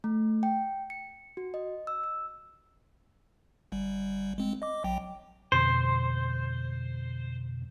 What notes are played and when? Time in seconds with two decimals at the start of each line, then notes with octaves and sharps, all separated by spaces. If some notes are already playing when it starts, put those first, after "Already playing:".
0.04 A3
0.43 G5
0.90 C#7
1.37 F#4
1.54 D#5
1.87 E6
2.04 E6
3.72 G1 G3
4.38 G#3 C4
4.62 D#5 D6
4.84 A#1 F#3 G5
5.52 F2 B2 D3 C5